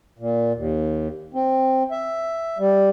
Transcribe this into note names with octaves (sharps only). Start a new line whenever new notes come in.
A#2
D#2
C4
E5
G3